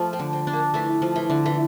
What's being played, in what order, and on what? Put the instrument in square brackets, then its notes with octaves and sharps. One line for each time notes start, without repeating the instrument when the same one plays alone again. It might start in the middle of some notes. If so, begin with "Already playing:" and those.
Already playing: [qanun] F3 A3
[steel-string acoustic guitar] C4
[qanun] D3
[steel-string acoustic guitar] C4
[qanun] D4
[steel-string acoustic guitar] A#3
[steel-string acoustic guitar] E3 [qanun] A3
[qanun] F3
[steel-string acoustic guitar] E3
[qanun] D3
[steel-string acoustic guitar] E3